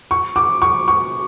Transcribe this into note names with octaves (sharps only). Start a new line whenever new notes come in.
C#6
D6
C#6
C#6